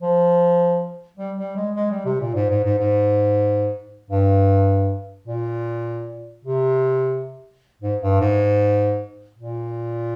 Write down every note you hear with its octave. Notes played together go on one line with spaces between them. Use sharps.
F3
G3
G3
G#3
G#3
G3
C3
A#2
G#2
G#2
G#2
G#2
G2
A#2
C3
G#2
G2
G#2
A#2